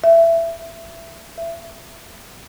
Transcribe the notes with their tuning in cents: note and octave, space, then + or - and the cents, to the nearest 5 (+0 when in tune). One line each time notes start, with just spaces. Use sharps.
E5 +20
E5 +30